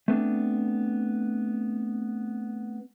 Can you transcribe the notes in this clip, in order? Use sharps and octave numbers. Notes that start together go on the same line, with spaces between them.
A3 B3 C4 D4